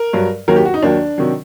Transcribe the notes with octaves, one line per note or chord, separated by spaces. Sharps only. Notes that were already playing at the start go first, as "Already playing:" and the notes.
Already playing: A#4
G2 F#3
D#2 D#3 F#3 A#4
G4
F#4
D#4
D#2 D#3 F#3 D4
C3 D#3 F#3